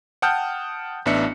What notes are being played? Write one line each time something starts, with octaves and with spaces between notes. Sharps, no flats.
F#5 G5 A5 D#6 F6 G6
A1 B3 D4 E5 C#7